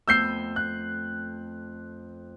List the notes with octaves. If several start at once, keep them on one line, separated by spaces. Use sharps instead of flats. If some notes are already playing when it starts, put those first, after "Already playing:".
F2 A3 B3 E6 G6 C7
F#6